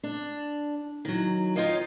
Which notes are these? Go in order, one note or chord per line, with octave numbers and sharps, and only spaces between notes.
D4
D#3 F#3
D#4 F4 C#5 D#5 F5 G5